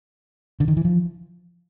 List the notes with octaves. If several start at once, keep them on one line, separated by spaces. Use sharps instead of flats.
D3
D#3
E3
F3